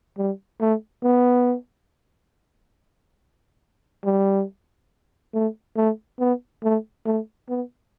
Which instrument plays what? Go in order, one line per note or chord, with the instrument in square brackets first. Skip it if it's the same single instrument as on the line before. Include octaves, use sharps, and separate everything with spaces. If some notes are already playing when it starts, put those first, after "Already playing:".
[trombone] G3
A3
B3
G3
A3
A3
B3
A3
A3
B3